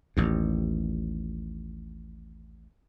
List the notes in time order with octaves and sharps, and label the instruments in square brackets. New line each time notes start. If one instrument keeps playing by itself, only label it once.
[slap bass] A1 D#2